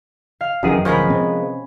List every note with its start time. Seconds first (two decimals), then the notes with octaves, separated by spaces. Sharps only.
0.41 F5
0.63 F#2 D#3 E3 F#3 G#4
0.85 D1 G1 F3 G#3 B3 C#4 A#4 B5
1.09 C3 C4